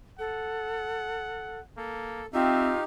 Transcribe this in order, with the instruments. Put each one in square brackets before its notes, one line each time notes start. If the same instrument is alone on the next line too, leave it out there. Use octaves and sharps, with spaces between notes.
[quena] A4 [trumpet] F#5
[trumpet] A#3 [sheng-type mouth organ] A4
[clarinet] C4 [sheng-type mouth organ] D#4 G4 [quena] F4 [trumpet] E5